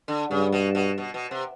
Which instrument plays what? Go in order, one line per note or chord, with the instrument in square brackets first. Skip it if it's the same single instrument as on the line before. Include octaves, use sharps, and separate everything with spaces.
[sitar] D3
[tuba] G2 [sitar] C#3
[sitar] B2
B2
B2
B2
C3